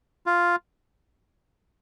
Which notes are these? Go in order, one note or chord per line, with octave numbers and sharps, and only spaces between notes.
F4